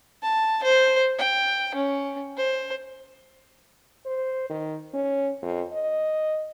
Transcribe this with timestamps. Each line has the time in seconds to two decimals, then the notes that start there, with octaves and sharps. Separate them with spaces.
0.22 A5
0.64 C5
1.19 G5
1.75 C#4
2.37 C5
4.06 C5
4.50 D#3
4.94 C#4
5.42 F2
5.73 D#5